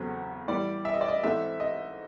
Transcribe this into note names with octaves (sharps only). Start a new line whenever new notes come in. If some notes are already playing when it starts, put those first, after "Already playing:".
Already playing: E2 C#3 F#3 A3 C4
A2 E3 G3 D5
E5
D#5
D5
D#5
G#2 E3 A3 C4 E5
D#5